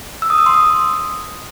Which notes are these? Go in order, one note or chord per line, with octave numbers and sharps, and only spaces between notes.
E6
D#6
E6
C6
D#6